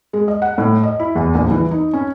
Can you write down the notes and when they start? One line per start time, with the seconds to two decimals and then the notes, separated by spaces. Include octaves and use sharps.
0.13 G#3
0.28 D#5
0.42 F#5
0.58 A2
0.83 D#5
0.99 E4
1.15 E2
1.35 A#1
1.51 E3
1.71 D#4
1.93 C#4